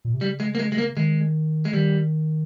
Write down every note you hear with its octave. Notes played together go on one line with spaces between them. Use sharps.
A#2
C3
C#3 G3
G#3
A#3
G#3
G#3
A#3
D#3 G#3
G#3
D#3 G3